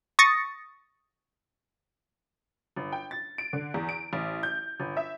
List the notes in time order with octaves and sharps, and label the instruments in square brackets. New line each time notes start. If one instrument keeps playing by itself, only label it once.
[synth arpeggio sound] C#6 D#6 A6 A#6 C#7
[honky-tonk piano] G1
G5
A6
D7
D3
E2
D7
A1
G6
G1
E5